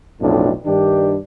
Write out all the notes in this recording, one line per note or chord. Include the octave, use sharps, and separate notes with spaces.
B1 F2 A2 D4
G2 D#3 D4 G4